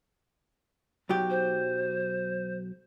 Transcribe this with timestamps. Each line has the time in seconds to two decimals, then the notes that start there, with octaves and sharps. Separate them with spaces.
1.09 B1 F#3 G4
1.30 C5